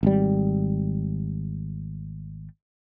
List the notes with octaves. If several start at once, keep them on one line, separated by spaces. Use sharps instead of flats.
G#1 G3